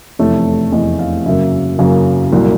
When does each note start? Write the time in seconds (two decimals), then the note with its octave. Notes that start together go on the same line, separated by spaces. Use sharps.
0.19 F1 E2 C3 E3 A3 C#5
0.72 F1 E2 C3 E3 A3 D#5
0.99 F5
1.26 F#2 C#3 F#3 A#3 E5
1.79 F#2 C#3 F#3 A#3
2.33 C2 A#2 F#3